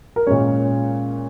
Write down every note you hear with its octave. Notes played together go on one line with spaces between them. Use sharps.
A#4
A#2 G#3 C#4 C#5